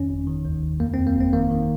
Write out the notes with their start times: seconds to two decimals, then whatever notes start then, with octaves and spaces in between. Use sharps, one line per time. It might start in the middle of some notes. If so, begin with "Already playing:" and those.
Already playing: F2 D#3 C#4
0.09 G1
0.27 D#3
0.45 D#2
0.62 D#2
0.80 F2 A#3
0.94 C4
0.98 F2
1.07 A#3
1.16 G1 C4
1.33 D#3 A#3
1.51 D#3